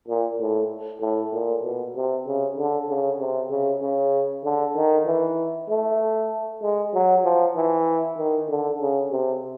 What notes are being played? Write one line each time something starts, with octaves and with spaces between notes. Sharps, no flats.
A#2
A2
A2
A#2
B2
C3
C#3
D3
C#3
C3
C#3
C#3
D3
D#3
E3
A3
G#3
F#3
F3
E3
D#3
D3
C#3
C3